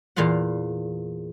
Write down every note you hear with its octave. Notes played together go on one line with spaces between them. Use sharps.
E2 A#2 F4 F5 F#5